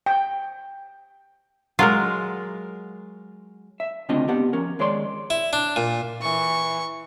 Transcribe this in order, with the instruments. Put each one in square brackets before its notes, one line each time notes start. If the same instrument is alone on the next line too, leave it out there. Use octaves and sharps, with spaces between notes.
[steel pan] G5
[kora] F#3 G#3 A#4 [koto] F4
[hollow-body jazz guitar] E5
D2 C#3 C4 D4 F4 D#5
B3 G4 F#5
F3 C#4 A#4
D#2 G#3 C#5 D5 C6
[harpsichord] E4
D4
A#2
[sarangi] E3 [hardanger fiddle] C#6